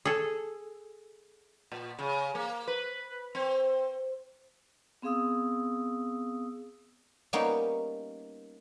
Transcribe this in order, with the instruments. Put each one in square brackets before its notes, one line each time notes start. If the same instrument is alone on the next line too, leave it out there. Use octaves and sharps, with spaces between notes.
[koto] G#4 A4
[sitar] A#2
C#3
A#3
B4
C4
[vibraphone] B3 C4 G#4 F5 D#6 E6
[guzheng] G3 A#3 B3 C#4 D#4